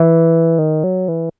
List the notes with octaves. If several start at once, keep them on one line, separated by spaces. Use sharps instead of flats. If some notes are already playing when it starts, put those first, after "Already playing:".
Already playing: E3
D#3
F#3
E3